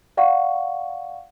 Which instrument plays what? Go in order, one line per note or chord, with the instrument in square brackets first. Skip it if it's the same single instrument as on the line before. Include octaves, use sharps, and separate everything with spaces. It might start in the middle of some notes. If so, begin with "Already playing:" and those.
[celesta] D5 F5 F#5 C#6